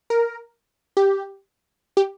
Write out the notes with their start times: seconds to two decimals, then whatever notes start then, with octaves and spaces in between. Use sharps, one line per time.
0.10 A#4
0.97 G4
1.97 G4